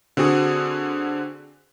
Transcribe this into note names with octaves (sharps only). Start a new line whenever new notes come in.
D3 C4 F#4 G#4